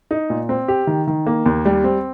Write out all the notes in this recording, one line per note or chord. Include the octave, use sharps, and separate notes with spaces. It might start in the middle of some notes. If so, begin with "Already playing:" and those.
D#4
A#2
C4
G4
D#3
D#3
A#3
D#2
G3
C4